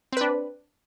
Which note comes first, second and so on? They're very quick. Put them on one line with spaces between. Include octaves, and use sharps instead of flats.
C4 B4 D4